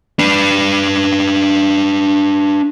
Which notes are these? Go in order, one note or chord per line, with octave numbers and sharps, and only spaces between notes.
D4 B4